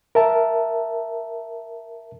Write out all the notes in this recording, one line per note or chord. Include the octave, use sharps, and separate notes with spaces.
A#4 E5 A5